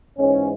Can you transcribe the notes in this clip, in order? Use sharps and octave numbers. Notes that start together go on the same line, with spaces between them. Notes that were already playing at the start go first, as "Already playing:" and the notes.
G#2 E3 G#3 C#4